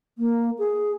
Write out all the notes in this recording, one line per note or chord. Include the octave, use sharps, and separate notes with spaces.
A#3
G#4